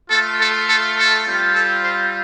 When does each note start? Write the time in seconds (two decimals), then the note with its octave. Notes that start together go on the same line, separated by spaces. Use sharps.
0.11 A3 F4 A4
0.40 A4
0.67 A4
0.97 A4
1.26 G3 C4 F4
1.54 A4
1.83 C5